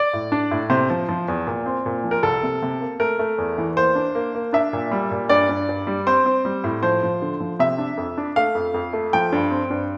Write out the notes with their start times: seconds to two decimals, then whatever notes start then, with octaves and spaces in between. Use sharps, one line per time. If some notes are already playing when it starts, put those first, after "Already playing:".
Already playing: D5
0.13 A2
0.32 D4
0.51 A2
0.70 C3 C5
0.90 F3
1.09 F3
1.28 E2
1.47 A#2
1.66 C4
1.86 A#2
2.04 F3
2.11 A#4
2.23 C2 A4
2.43 C3
2.62 C3
2.81 A#3
3.00 A3 A#4
3.19 A3
3.38 E2
3.58 E3
3.77 A#3 C5
3.95 D4
4.15 A#3
4.35 A#3
4.53 D4 E5
4.73 A#2
4.91 G3
5.11 A#2
5.29 G2 D5
5.49 G2
5.69 G2
5.87 G3
6.07 C4 C5
6.26 C4
6.45 G3
6.64 A2
6.83 F3 C5
7.03 F3
7.22 D3
7.41 F3
7.59 C3 E5
7.78 D4
7.98 F2
8.18 D4
8.36 A3 F5
8.55 F2
8.74 F2
8.93 A3
9.13 F3 G5
9.32 G2
9.51 C4
9.70 G2